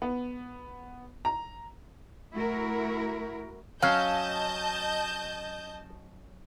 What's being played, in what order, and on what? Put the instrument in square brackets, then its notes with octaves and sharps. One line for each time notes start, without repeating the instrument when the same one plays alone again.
[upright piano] B3
A#5
[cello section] A3 E4 F#4 A#4
[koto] F#3 C#4 [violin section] D#5 A5 G6 [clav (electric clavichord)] F5